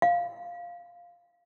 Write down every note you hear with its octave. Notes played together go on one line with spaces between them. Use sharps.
F5